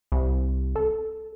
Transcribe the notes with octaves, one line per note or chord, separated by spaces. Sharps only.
C2
A4